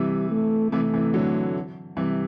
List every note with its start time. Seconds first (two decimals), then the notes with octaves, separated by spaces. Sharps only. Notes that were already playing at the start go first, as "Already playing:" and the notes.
Already playing: C3 E3 G3
0.31 A3
0.72 C3 E3 A3
0.94 C3 E3
1.14 D3 F#3
1.97 C3 E3 G3